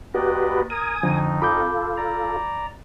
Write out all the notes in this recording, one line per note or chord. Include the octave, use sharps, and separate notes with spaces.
D#2 F#4 G4 B4 D5 D#5
A#4 G#5 D#6
F2 D3 F3 D#4
F4 A4 B5 D6 G6
D5 A#5